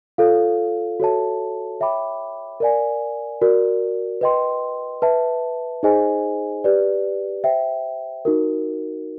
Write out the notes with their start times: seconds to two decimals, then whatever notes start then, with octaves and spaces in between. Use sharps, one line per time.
0.18 F4 A4 C#5 F5
1.00 F#4 A4 C#5 E5 A5
1.80 C#5 E5 G5 B5 D6
2.60 A#4 D5 F5 G#5
3.42 F#4 A#4 D5
4.21 B4 D#5 G5 C6
5.02 B4 E5 A5
5.83 D#4 G#4 C5 D#5 G#5
6.64 G4 B4 D5
7.44 C5 E5 G5
8.25 D#4 F#4 A#4